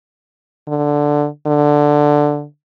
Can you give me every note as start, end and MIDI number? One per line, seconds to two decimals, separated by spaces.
0.68 1.27 50
1.47 2.45 50